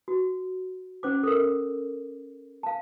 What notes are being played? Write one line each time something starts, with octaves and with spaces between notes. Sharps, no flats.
F#4
C#4 C5 D6
A4 A#4
F5 A5